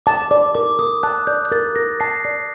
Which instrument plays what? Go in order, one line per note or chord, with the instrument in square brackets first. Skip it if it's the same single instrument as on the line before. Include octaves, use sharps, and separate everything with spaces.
[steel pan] A5 [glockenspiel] D6
[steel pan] D5 [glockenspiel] D6
[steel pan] A#4 [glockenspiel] D6
[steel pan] A#4 [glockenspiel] D#6
[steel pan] A5 [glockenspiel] F#6
[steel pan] D5 [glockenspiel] G6
[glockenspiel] G6
[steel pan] A#4 [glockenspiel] A6
[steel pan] A#4 [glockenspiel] A#6
[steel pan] A5 [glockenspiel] C7
[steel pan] D5 [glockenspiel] C7